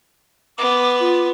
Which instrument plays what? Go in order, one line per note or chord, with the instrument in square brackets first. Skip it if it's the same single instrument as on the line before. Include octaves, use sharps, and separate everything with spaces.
[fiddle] B3 [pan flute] D6
[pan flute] F4